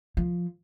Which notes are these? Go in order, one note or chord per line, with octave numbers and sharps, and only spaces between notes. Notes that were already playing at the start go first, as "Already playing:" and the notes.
F3